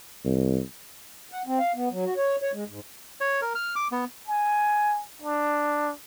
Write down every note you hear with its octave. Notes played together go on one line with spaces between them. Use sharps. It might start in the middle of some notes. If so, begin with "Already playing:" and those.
C2
F#5
C4
F5
B3
F#3
F#4
C#5
C#5
G#3
G#2
C#5
A#4
F6
D6
B3
G#5
D4